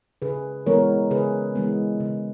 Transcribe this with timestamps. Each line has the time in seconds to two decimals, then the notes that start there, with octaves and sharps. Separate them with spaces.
0.22 C#3 G#4 B4
0.66 E3 G#3 B3 A#4 C#5
1.11 C#3 G#4 B4
1.55 E3 G#3 B3
2.00 C#3